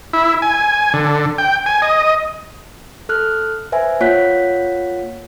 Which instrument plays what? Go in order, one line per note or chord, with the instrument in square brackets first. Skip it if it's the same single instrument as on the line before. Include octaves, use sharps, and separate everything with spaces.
[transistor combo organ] E4
G#5
D3
G5
G#5
D#5
[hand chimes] A4 F6 F#6
B4 C5 E5 G#5
A#3 F4 C#5 F#5 F#6 B6